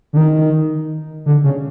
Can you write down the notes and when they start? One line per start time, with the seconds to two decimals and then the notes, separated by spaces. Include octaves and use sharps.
0.13 D3
0.17 D#3
1.26 D3
1.44 C#3